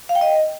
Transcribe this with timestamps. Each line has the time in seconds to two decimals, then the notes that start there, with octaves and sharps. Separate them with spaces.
0.09 F5
0.15 G5
0.21 D#5